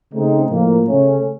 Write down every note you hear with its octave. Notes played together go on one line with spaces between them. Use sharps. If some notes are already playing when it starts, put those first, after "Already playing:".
C#3 A3 C4 D#4
A2 F3 A#3
C#3 A3 C#4